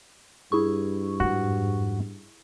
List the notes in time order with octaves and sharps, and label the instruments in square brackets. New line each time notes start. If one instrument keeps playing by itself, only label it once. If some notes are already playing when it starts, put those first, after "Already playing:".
[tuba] G2 [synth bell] E4 G#4 C#6
[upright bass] F2 G#2 [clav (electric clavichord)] F#4